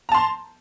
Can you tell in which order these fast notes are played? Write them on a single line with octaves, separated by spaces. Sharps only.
A#5 A5 C6